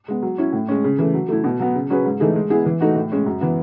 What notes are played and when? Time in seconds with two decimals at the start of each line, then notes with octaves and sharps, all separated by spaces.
0.08 G#3 B3
0.22 F#3
0.38 C#4 E4
0.53 A2
0.68 G#3 C#4
0.84 C#3
0.99 E3 A3
1.14 F#3
1.29 A3 E4
1.44 B2
1.60 F#3 B3
1.75 C#3
1.90 F#3 C#4 G#4 B4
2.05 G#2
2.20 E3 A3 D#4 G#4
2.36 G#3
2.50 B3 E4 G#4
2.66 E3
2.81 A3 D#4 F#4
2.95 A2
3.12 G#3 C#4
3.26 F#2
3.41 E3 B3